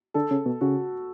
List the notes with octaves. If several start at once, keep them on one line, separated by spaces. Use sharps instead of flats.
D3 A4
C#3
B2
C#3 F#4